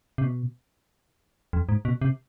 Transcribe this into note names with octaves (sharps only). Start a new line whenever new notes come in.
C3
B2
F2
G#2
B2
C3